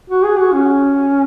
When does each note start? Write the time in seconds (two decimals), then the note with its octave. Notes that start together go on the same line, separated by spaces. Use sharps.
0.10 F#4
0.24 G#4
0.39 F#4
0.54 C#4